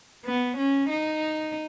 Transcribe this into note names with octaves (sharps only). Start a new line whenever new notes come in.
B3
C#4
D#4